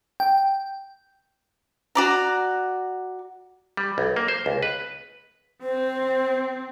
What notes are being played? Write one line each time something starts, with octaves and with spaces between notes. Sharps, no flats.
G5
F#4 D5 A#5
G3
B1
A#3
C5
C#2
B4
C4 C5